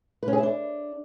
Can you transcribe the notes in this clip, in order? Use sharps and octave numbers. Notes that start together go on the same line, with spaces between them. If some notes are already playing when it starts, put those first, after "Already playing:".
B4
C#4
G#4
E4
D4